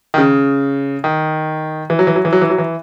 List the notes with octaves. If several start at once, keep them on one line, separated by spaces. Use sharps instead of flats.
D#3
C#3
D#3
E3
F#3
E3
F#3
E3
F#3
E3
F#3
E3